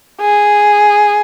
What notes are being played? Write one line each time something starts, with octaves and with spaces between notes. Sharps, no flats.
G#4